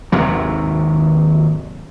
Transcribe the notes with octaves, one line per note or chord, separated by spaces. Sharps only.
G#1 D#2 C3 F#3